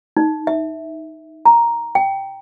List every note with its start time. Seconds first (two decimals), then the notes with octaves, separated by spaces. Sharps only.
0.17 D#4
0.47 E5
1.45 A#5
1.95 G5